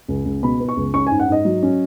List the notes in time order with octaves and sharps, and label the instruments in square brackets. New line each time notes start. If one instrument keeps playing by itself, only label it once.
[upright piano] C#2
C#2
B2 B5
B3
C#6
C#2
C#4 C#6
G#5
G#2
F#5
G#2 D#5
F#3
C#4